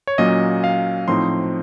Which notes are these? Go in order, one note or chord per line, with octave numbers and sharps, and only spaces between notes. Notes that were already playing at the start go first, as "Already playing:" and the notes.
C#5
A#2 F#3 A#3 C#4 D#5
F5
A2 F3 C4 D#4 C6